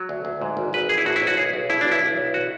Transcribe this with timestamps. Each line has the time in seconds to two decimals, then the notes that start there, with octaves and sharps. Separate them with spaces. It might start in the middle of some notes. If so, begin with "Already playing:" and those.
Already playing: F#3
0.09 D2
0.25 D2
0.41 G#2
0.57 G#1
0.73 G#1 B4
0.89 E3 G#4
0.98 E4
1.05 A2 F#4
1.16 E4
1.22 B1
1.27 F#4
1.37 B1 G#4
1.54 B1
1.69 B2 E4
1.81 B1 D4
1.92 E4
2.02 B1
2.17 B1
2.34 F#4